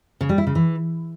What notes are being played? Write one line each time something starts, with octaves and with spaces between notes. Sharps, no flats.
C#3
G3
E4
C#3
E3